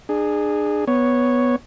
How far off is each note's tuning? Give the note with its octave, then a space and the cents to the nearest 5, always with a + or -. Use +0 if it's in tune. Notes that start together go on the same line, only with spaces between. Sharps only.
D4 +35 G#4 +0
B3 +0 C#5 +0